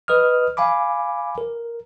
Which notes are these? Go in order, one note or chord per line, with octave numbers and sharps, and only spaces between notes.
B4 D#5 D#6 F6
F5 G#5 B5 D6
A#4